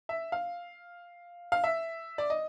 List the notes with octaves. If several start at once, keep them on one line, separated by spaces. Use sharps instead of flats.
E5
F5
F5
E5
D5
D#5